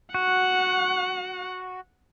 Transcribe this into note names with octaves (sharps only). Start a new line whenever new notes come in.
F#4 F#5